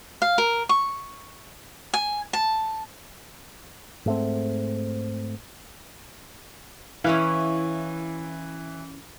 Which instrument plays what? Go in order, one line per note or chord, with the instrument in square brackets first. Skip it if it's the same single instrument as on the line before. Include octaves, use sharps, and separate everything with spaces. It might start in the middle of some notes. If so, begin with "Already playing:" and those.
[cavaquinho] F5
A#4
C#6
G#5
A5
[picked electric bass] G#2 A3 C4
[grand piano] E3 [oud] C#4 E4 F5